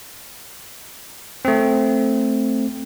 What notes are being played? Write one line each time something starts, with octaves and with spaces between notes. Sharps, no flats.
A3 C4